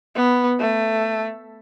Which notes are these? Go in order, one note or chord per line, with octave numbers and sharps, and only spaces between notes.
B3
A3